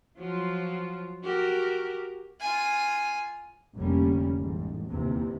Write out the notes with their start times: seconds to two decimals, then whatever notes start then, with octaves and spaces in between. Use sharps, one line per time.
0.17 F3 F#3 F4
1.24 F#4 G4 A#4
2.40 F4 G#5
3.75 F1 D3 G3 A#3 C#4
4.36 A1 G#2
4.89 G1 D#2 C3 E3